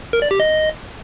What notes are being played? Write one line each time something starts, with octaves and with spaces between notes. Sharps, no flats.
A#4
D5
G4
D#5